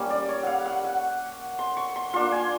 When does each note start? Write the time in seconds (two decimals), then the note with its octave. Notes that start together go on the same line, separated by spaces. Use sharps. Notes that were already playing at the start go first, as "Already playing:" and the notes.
Already playing: G3 A#3 C#4
0.10 D5
0.29 C#5
0.43 F5 F#5
0.66 F#5
0.84 F#5
1.59 C6
1.77 C#6
1.96 C6
2.13 A#3 D4 F4 C6
2.32 G#5